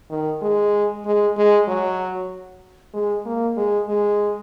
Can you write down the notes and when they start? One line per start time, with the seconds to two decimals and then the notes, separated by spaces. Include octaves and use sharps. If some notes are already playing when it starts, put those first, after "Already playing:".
0.10 D#3
0.42 G#3
1.05 G#3
1.37 G#3
1.68 F#3
2.94 G#3
3.25 A#3
3.57 G#3
3.88 G#3